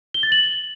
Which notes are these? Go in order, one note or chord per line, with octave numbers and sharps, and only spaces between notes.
G7
A6
F#7